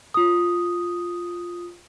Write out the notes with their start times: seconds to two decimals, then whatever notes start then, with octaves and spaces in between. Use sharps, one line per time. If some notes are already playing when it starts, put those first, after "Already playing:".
0.14 F4 D#6